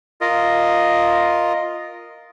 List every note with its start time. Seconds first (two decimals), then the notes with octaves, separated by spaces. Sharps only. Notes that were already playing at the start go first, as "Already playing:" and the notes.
0.21 F4 A#4 D#5